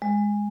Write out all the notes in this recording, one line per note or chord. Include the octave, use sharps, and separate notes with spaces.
G#3